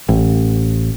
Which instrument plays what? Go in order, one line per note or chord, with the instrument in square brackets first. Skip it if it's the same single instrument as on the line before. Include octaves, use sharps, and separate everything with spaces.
[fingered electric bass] A1